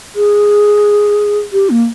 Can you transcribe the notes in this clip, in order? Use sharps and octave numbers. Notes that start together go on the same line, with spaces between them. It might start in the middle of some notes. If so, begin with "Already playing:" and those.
G#4
G4
A#3